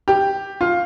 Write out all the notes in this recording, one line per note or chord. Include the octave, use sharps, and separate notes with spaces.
G4
F4